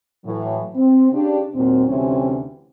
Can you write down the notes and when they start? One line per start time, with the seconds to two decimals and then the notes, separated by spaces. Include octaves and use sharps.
0.25 A2 E3 F#3
0.76 C4
1.11 C#3 D4 G4
1.54 D#2 A#2 F#3 C4
1.86 D2 C3 E3 G3 C4 C#4